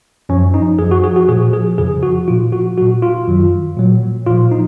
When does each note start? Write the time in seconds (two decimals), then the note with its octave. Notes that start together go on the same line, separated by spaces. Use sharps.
0.29 F#2 F3 C#4
0.54 D#4
0.79 F#2 F3 G#4
0.91 F#4
1.04 G#4
1.16 F#4
1.29 A#2 G#4
1.32 F3
1.53 G#4
1.78 F2 C#3 F3 G#4
2.03 F#4
2.28 A#2 F3 F4
2.52 F#4
2.78 F#3 F#4
2.81 A#2
3.02 F4
3.28 F#2 D#3 F#3
3.77 A#2 F#3
4.27 A#2 F3 F4
4.51 D#4